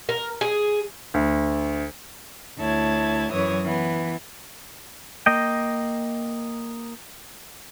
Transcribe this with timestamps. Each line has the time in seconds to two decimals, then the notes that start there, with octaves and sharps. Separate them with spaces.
0.09 A#4
0.41 G#4
1.14 D2
2.58 D2 E4 C#5 A5 G#6
3.31 F#2 E3 F#3 C#5 D#6
3.64 E3 B3
5.26 A#3 D#5 G5